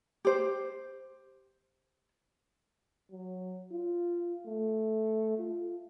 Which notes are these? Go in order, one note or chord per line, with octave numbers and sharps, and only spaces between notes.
G4 C5
F#3
F4
A3
F4